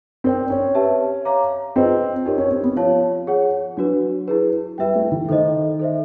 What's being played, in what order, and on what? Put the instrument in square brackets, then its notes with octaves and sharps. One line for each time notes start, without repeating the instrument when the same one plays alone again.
[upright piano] C4 [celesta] A#4 D5 G5
[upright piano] C#4
[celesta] G4 B4 E5 A5
C#5 F5 A#5 D6
[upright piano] C4 [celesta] F4 G#4 B4 D#5 G5
[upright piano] C#4 [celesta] D#4 G4 A#4
[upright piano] C#4
C4
B3
[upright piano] F3 [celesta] C#5 F5 A5
[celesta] G#4 C#5 F#5
[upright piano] F#3 [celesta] D4 F#4 B4
[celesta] E4 G#4 B4
[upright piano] G3 [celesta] B4 E5 G5
[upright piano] A3
E3
[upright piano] D#3 [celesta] A4 C5 D#5
[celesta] A4 C5 E5